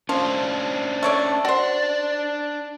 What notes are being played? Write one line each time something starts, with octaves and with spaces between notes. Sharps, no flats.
F3 C#4 D4 C5
A3 C#5 D5
D4 F#4 C5 D5